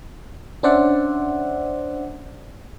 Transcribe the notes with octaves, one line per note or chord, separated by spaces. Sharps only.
C#4 D4 C5 D5 E5 F#5